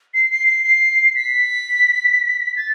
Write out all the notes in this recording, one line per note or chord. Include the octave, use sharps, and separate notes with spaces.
C7
C7
C7
C7
B6
A6